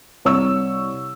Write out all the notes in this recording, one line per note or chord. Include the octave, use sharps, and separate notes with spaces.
C2 C#5 C#6 E6